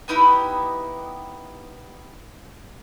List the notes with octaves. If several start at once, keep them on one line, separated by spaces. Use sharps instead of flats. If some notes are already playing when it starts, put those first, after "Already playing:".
B3 D#4 E4 G4